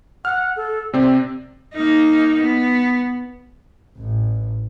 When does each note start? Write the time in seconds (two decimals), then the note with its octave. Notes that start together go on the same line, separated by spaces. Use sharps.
0.25 F#5 F6
0.56 A4
0.93 C3 C4 D5
1.74 A#3 D#4
2.40 B3
3.98 A1